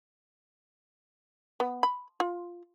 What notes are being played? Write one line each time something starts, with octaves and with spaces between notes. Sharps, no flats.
B3
B5
F4